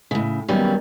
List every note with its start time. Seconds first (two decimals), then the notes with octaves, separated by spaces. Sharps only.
0.11 A2 C#3
0.48 D#3 F#3 G3 A#3 B3 C#4